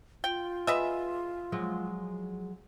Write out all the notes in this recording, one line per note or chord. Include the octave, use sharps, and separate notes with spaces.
F4 G5
G#4 B4 D#5 E5
F3 F#3 G#3